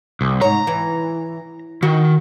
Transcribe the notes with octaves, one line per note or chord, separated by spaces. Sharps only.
C2
G#2 C#5 A#5
E3
D#3 F#4